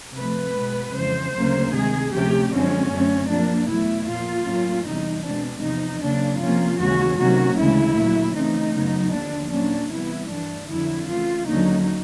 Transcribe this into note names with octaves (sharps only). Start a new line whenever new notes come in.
C3 F3 A3 B4
B2 G#3 B3
F2 C#3 E3 G#3 C5
D2 C#3 F#3 A#3
C3 D#3 G#3 G#4
D2 C3 F3 A3 C#4 G4
F#2 D3 F3 G#3 C4 C#4
F#2 D3 F#3 A3 C4
A#2 F3 A#3 D4
E2 B2 F#3 A3 E4
A#2 F3 A#3 F4
A2 F#3 A#3 C#4
E2 C3 E3 G3 D#4
B2 G#3 C4 D4
E2 C3 F3 D#4
C#3 F#3 A#3 D4
C3 F3 A#3 C#4 F4
D#2 C#3 E3 G#3 C#4 F#4
C3 D#3 F#3 A#3 C#4 F#4
D2 C#3 E3 G#3 E4
A#2 F#3 A3
C#3 E3 A3 C4 D#4
F#2 C#3 F#3 B3
D#2 D3 F3 D4
A#2 F#3 A#3 C#4 D4
C3 E3 G3 B3 E4
G2 E3 A3 D4
F2 D3 F#3 E4
C#3 E3 A3 F4
D#2 D3 F#3 A#3 C#4 D#4